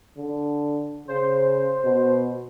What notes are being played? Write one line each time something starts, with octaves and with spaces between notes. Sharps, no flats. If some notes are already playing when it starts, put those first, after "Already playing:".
D3
C#3 C5
B2